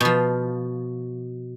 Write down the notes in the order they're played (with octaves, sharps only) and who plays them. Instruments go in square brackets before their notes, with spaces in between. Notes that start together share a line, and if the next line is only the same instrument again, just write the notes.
[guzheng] B2 F3